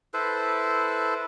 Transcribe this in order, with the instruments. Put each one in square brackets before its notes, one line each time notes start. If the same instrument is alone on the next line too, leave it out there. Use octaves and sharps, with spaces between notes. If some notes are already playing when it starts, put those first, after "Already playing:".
[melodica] E4 A4 B4 C5